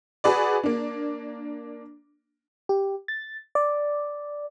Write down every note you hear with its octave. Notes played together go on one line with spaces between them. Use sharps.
F#4 G#4 B4 D5
A#3 D4
G4
A6
D5